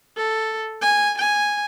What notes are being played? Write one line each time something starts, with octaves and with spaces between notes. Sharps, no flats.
A4
G#5
G#5